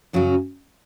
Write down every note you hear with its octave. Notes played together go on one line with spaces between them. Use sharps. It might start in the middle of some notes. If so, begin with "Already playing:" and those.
F#2 C#3 F#3 C#4 F#4